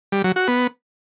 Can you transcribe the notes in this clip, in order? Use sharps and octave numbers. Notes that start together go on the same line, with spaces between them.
G3
F#3
F#4
B3